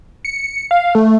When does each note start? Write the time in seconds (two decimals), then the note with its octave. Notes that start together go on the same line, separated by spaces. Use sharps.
0.25 C#7
0.71 F5
0.95 A3